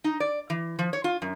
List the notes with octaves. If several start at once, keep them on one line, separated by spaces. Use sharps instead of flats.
D#4
D5
E3
F3
C#5
F4
F#2